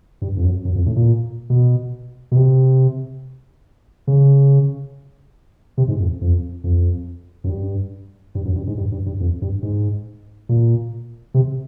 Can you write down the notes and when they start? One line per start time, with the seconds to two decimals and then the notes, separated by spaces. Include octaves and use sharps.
0.22 G2
0.37 F2
0.44 F#2
0.65 F#2
0.76 F2
0.86 A2
0.96 A#2
1.50 B2
2.32 B2
2.36 C3
4.07 C#3
5.78 C3
5.88 G#2
6.00 F2
6.21 F2
6.64 F2
7.44 F#2
7.49 G2
8.35 G2
8.45 F#2
8.56 G2
8.67 G#2
8.78 G2
8.92 G2
9.06 G2
9.20 F2
9.42 G2
9.63 G#2
10.49 A#2
11.34 C3